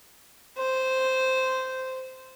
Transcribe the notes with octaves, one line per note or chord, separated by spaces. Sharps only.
C5